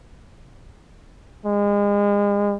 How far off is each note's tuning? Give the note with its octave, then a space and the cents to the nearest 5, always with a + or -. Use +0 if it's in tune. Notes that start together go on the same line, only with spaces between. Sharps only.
G#3 -35